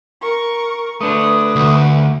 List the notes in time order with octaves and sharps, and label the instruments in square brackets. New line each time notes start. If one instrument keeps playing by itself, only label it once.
[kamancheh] A#4 C#6
[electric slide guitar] A3 D4 [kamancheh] B4 [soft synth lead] D#6
[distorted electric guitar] D2